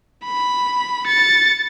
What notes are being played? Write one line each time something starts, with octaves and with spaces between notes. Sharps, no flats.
B5
A6 C#7